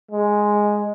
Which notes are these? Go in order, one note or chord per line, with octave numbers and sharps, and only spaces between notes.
G#3